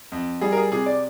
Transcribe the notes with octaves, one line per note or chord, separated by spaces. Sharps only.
F2
G3 G#4
A#4
G#4
C3 G#4
D5